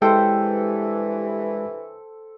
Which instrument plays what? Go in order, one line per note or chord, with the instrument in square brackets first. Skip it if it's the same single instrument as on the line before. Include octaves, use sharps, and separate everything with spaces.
[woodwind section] G2 E3 [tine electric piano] G#3 E4 G4 [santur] A4 [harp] C5 G5